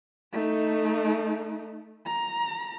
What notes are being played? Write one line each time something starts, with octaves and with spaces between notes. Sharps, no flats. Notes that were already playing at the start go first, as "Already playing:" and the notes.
A3 D#4
A#5